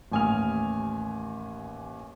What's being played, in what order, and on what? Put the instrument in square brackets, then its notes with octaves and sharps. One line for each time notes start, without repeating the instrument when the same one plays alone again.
[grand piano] A1 D#2 G#5 D#6 F6 F7